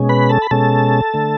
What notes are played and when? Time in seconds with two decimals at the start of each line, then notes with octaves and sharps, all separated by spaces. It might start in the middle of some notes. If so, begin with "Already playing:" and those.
Already playing: B2 G#3 C#4
0.09 B4 B5
0.29 A4 A5
0.42 B5
0.51 B2 G#3 C#4 A4 A5
1.14 D3 A3